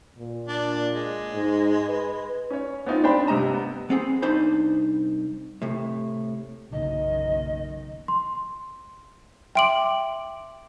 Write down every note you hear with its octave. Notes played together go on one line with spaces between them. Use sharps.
A#2
D4
G#3
G#2
B4
C#4 C#5
B3 C4 D#4 F4
D4 C5 G5 B5
G2 C3 G4 D#5 A#5 E7
B3
B3 C4 G#4
C2 D4 D#4 C5 B5
A2 C3
F#1 B1 D#3 D#5
C6
E5 G5 C6 D6 D7 F#7